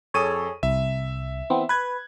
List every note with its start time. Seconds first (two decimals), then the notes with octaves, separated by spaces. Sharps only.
0.14 F2 G#4 A4 C#5 D#7
0.63 C2 E5
1.50 E3 B3 C4
1.69 B4 F#6 G#6